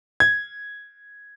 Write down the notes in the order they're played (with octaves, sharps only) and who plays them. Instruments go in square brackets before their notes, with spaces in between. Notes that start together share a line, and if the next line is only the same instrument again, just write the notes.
[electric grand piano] G#6